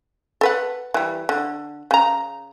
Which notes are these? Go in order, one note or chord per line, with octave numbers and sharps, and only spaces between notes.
A4 B4 F#5
E3 G3
D3
C#3 A#5